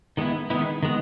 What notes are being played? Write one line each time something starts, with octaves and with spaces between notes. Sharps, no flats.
D#3 G#3 B3 E4
D#3 G#3 B3 E4
D#3 G#3 B3